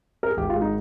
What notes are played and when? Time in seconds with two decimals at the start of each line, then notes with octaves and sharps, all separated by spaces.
0.23 A#4
0.30 G#4
0.37 G#1 G4
0.50 F4
0.55 G#3
0.61 D#4